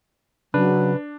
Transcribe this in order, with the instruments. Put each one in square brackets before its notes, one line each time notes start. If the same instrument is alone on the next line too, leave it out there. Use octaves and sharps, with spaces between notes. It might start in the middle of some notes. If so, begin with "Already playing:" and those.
[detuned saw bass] C#3 [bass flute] F#3 [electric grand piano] D4 [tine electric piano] B4